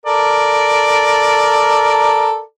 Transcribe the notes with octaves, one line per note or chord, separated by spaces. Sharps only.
A4 A#4 D5